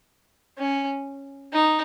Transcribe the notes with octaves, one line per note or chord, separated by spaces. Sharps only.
C#4
D#4